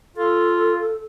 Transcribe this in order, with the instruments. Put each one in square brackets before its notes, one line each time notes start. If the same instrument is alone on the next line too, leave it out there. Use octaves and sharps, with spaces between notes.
[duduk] F4 [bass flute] A4